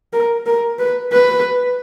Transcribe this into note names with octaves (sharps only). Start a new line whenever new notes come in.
A#4
A#4
B4
B4